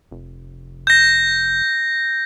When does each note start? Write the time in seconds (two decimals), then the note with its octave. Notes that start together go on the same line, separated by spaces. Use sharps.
0.11 F1
0.87 G6 A#6